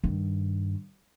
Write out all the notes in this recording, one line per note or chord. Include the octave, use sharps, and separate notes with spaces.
G2 D#3